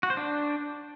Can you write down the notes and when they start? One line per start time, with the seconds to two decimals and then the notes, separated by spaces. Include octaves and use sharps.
0.03 F#4
0.10 C5
0.17 D4